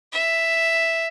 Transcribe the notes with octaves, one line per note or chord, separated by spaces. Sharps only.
E5